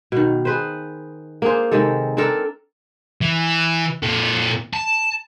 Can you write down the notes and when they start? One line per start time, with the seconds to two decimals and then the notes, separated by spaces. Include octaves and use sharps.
0.12 B2 D#3
0.45 G#4 B4 C5
1.42 A#3 D4 G#4 C5
1.72 C3 D#3 G#3 A4
2.17 C4 D4 A4 A#4
3.21 E3
4.03 A#2 A4
4.73 A5